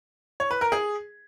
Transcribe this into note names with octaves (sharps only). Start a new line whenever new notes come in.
C#5
B4
A#4
G#4